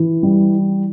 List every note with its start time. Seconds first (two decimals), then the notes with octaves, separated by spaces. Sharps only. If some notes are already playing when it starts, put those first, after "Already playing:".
Already playing: E3
0.23 G3